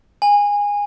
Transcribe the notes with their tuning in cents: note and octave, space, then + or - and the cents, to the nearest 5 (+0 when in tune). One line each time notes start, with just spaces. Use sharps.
G#5 -20